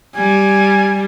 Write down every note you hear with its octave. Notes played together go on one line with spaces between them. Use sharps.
G3 G#5